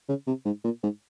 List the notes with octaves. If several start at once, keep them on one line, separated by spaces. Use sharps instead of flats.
C#3
C3
G#2
A#2
G#2